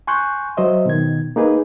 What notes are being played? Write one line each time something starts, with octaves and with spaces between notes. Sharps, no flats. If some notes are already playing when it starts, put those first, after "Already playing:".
G#5 C6 C#6 F#6 G6
F#3 C5 D#5 E5
B2 D#3 G#6
A#3 D#4 G#4 B4